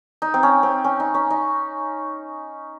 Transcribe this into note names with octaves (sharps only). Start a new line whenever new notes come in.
D#4
C4
C#4
C4
C#4
D#4
C#4
D#4